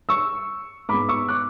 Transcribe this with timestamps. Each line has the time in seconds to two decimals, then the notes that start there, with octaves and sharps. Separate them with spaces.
0.09 C#6 E6
0.89 G#2 G#3 B3 B5 D6
1.09 C#6 E6
1.28 D6 F#6